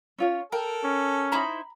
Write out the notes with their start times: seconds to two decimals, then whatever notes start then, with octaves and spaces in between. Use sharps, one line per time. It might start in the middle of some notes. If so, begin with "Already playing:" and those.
0.18 C#4 F4 C#5
0.52 A4 A#4 G5
0.84 C#4
1.32 D#4 E4 C5 A#5 B5